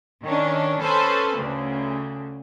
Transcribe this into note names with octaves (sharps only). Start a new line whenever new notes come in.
D#3 C#4 D4
C#4 A4 B4 C5
D2 C#3